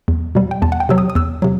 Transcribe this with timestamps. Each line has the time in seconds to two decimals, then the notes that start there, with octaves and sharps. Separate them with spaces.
0.08 E2
0.35 B2 G3
0.51 G5
0.62 E2 A5
0.72 F#5
0.80 G5
0.89 C3 F#3 E6
0.98 D#6
1.10 D#6
1.15 E2 E6
1.42 C3 F#3